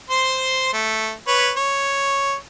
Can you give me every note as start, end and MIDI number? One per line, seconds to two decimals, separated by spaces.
0.10 0.71 72
0.10 0.71 84
0.73 1.12 57
1.28 1.50 71
1.28 1.50 73
1.57 2.35 73